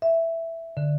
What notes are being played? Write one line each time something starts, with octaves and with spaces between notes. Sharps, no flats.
E5
D3